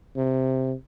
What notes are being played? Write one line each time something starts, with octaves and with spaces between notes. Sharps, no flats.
C3